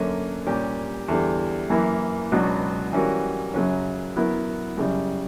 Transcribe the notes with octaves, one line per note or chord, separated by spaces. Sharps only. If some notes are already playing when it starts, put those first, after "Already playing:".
Already playing: F#2 D3 A#3 C#4
A#2 G3 C#4 G4
E2 D3 G3
F#2 E3 A#3 E4
C#2 B2 F#3 B3 D4
E3 G3 C#4 F#4 A#4
F#2 C#3 F#3 C#4
F#3 B3 E4 A#4
F#2 C#3 G3